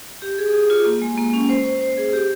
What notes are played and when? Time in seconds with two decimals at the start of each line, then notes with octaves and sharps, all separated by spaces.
0.22 G4
0.38 G#4
0.53 G#4
0.70 F4
0.85 A#3
1.02 G#3
1.18 A#3
1.34 C#4
1.49 C5
1.65 C5
1.81 C5
1.97 G#4
2.13 G4